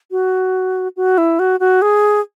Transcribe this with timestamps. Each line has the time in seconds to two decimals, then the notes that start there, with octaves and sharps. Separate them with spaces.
0.11 F#4
0.97 F#4
1.18 E4
1.39 F#4
1.60 F#4
1.82 G#4